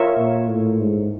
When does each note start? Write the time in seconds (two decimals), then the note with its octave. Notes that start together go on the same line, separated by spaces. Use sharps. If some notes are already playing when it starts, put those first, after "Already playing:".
Already playing: F4 A#4 C#5 E5
0.18 A#2
0.49 A2
0.80 G#2